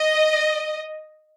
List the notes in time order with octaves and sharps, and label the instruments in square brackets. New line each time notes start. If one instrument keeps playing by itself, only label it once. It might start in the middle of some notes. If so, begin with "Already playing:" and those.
Already playing: [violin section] D#5